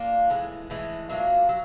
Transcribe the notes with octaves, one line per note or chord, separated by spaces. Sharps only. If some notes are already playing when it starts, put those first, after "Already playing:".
Already playing: A#3 D4 F4
A2 E3 G#3
A2 E3 G#3
F#3 A#3 D4 F4
F#3